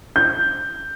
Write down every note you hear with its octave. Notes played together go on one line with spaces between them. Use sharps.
G6